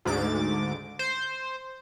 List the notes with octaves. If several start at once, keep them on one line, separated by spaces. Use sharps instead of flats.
D2 G#2 D6 A6
C5